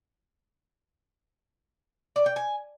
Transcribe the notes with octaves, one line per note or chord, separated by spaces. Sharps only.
D5
G5
G#5